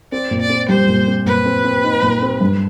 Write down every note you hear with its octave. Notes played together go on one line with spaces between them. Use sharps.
C4 D5
A#2
D5
C4
G3 C5
A#2
C4
A#2 B4
C4
C4
D#4
A#2
C4
G2